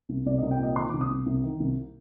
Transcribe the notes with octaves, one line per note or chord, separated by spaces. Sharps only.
C2
C2 D5
C2 D#5
G5
A#2 D#5
D#3 C6
C2 D6
D#6
C2
C2
D#3
C2